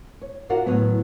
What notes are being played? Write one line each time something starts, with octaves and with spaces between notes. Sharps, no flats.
C#5
D4 F4 F#4 A#4
A2 D#3 F#3 B3